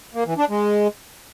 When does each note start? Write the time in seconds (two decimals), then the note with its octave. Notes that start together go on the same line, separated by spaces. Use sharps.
0.14 A#3
0.26 E3
0.38 D4
0.49 G#3